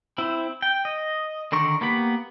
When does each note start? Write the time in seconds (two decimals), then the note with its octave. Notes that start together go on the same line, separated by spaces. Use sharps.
0.18 C4 E4
0.62 G5
0.85 D#5
1.52 D3 D#3 A#4 C#6
1.81 A#3 B3 G4 B5